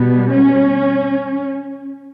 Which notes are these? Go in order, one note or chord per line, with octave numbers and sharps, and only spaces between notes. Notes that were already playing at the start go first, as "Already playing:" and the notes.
Already playing: B2 G3 B3
C#4